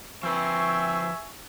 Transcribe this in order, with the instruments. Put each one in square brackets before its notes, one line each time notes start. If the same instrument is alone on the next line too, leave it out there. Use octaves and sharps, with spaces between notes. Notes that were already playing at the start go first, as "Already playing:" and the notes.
[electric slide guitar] F3 B4 [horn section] C4 [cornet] E5 [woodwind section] G#5 C#6